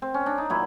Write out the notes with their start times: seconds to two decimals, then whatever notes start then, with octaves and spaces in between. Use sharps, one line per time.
0.02 C4
0.14 C#4
0.26 D4
0.38 D#4
0.50 A#2 F#3 E4